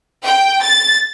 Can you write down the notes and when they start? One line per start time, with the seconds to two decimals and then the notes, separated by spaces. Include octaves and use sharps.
0.24 G5
0.62 A6